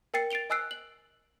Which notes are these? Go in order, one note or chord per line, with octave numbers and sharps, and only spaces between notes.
A#4 G5 A6 C7 C#7
A6 C7 D7 F7 G7
D#5 G#5 E6 F#6 C7 D7
F#7